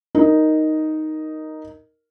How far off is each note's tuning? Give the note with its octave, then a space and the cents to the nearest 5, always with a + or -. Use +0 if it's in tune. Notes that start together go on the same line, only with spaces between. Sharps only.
D#4 +0 A#4 +0